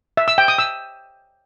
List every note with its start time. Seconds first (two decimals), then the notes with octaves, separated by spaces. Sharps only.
0.17 E5
0.28 E6
0.38 G5
0.48 D#6
0.58 E6